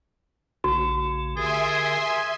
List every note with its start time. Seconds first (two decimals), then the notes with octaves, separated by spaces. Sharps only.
0.64 A#1 C#3 A3 F#4
1.37 D3 G4 G#4 A#4 E5 G#5 C6